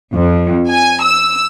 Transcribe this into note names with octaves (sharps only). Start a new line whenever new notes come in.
F2
G#5
E6